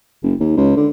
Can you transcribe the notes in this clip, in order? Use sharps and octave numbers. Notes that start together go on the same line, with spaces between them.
F#1
D#2
C#2
D3